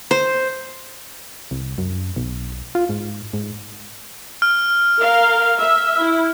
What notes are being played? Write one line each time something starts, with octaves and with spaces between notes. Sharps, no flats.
C5
C2
F#2
B1
F4
G#2
G#2
F6
A#4 F5
E5
E4